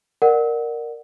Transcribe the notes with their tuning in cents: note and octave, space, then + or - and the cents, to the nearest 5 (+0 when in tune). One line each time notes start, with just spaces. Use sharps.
A#4 +0 D5 +25 F#5 +0